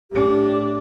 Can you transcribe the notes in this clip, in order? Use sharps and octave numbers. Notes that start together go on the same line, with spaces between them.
A2 D4 G4